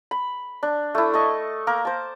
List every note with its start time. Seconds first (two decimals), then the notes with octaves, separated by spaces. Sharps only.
0.11 B5
0.63 D4
0.95 A3 E4
1.13 D#5 A5 C#6
1.67 A#3 A#4 D6
1.85 C5 A5